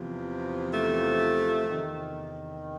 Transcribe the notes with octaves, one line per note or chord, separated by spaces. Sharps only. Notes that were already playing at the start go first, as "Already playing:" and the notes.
Already playing: E2 C3 F3
A3
E2 C3 D#3